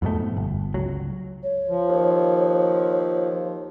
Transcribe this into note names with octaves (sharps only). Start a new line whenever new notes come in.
F2 G#2 B2 A3
G1
C#2 F#3
C#5
F3
D#2